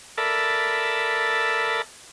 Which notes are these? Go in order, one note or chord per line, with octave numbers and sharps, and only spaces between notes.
A4 A#4 D5 E5 A5 B5